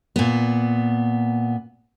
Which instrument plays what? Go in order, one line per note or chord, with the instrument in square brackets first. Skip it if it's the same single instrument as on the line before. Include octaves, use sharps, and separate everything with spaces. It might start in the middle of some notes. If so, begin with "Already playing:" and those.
[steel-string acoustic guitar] A#2 B3